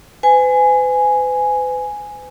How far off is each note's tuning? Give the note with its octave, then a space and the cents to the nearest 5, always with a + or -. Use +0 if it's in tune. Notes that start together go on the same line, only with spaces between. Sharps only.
B4 +45 G#5 +0